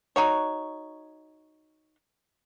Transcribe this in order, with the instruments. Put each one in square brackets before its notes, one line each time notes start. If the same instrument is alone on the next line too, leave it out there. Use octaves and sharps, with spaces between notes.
[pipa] D#4 F#4 C#5